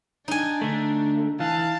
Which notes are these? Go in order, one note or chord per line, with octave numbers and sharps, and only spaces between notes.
D4 D#4 G#5
D3 A3
E3 F5 A5